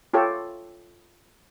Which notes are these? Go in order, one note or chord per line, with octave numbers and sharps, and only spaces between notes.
F4 G4 A4 C#5